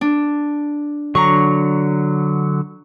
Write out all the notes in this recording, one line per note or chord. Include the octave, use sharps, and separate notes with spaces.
D4
D3 F#3 A#5 C#6